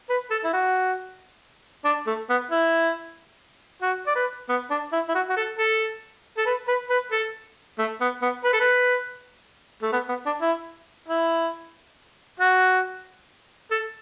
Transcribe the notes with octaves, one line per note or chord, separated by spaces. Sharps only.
B4
A4
E4
F#4
D4
A3
B3
E4
F#4
D5
B4
B3
D4
E4
E4
F#4
F#4
A4
A4
A4
B4
B4
B4
A4
A3
B3
B3
B4
A4
B4
A3
B3
B3
D4
E4
E4
F#4
A4